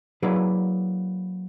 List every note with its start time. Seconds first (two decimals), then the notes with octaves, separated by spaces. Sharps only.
0.23 F#3 A#3 E4 G#4 B4 D5